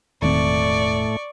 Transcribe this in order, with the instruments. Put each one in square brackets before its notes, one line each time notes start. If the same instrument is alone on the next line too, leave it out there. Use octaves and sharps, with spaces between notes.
[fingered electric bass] E1 D#3 C4 [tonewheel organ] A2 A3 [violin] D5 C#6